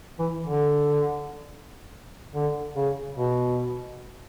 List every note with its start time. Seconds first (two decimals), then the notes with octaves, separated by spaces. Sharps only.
0.19 E3
0.46 D3
2.35 D3
2.76 C#3
3.16 B2